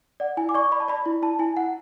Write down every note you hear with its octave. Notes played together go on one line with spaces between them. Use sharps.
D5 F#5
E4 G#5
D6
D5 C#6
D5 B5
A5
D5 B5
E4
E4 A5
E4 G#5
E4 F#5